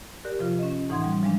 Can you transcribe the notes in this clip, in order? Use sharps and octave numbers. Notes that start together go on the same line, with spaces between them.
G4 A#4 D5 F#6
C3 F3 F4
C#4 D#5
A2 E3 D#4 F#5 C6 G#6
G3
F3 G3 G#3 D4